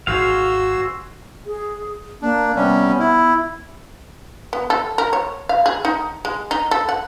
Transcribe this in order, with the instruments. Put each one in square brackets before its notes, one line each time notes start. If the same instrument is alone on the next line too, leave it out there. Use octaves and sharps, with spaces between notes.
[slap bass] G#1 [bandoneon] F#4 E6 [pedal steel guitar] G#4 C5 F5
[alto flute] G#4
[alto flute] A#3 [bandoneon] D4
[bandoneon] C3 G3 C#4 [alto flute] B3
[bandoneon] E4
[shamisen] B3
A4
A#4
C#5
F5
G#4
D#4
G#3
D#4
A4
F#5